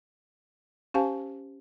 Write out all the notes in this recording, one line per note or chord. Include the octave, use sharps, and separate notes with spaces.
C#4 G4 C5 F5 G#5 A5